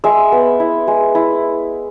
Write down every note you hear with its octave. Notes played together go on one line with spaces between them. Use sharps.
G#3 E5
B3
E4
G#3
E4